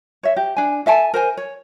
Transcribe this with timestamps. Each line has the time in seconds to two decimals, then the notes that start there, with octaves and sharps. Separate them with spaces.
0.23 C#5 E5
0.37 G4
0.57 D4 G#5
0.86 A4 E5 G#5 A5
1.14 A#4 C5 G#5
1.37 C#5